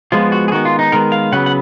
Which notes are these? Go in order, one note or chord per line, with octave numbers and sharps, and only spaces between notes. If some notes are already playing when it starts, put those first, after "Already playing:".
F3 G#3 B3 F4
F#4
G#4
D#3 G#3 B3 F#4
F4
D#4
D#3 G#3 B3 A#4
F5
C#3 F#3 B3 F#5
F#5